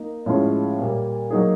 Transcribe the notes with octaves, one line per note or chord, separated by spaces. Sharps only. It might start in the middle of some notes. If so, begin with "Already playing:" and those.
Already playing: A#3 D#4
A2 F3 G#3 C#4 F4
A#2 G3 A#3
F#3 A#3 D#4 G#4